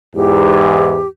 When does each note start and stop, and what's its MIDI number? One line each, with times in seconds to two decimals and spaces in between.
0.15 1.00 40
0.15 1.00 44
0.15 1.08 67